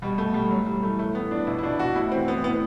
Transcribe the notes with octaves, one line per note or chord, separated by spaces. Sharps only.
B2 G3
B2 A3
B2 G3
A2 F#3
E3 G3
E3 A3
A2 A3
E3 B3
E3 D4
B2 E4
E4
B2 D4
B2 F#4
A2 E4
E3 C4
E3 B3
A2 B3